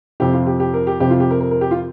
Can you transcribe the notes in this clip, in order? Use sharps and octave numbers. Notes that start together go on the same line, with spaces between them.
F2 C3 G4
F4
G4
G4
A#4
G4
F2 C3 G4
F4
G4
A#4
A#4
A#4
G4
F4